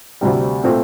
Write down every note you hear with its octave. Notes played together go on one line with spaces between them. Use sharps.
D2 C3 G3
A#2 A3 C4